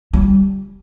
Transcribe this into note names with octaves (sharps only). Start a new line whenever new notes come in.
G3